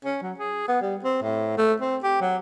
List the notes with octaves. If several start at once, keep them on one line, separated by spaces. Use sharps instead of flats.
C#4
F#3
G#4
B3
G3
C4
A2
A3
C4
G4
F#3